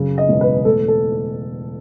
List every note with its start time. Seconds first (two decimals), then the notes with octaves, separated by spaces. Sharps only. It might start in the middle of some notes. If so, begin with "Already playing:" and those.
Already playing: F#2 C#3
0.18 D#5
0.29 E1
0.41 B4
0.65 A3 A4
0.88 A4